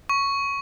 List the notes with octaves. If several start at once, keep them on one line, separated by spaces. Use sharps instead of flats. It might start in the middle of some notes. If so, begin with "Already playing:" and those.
C#6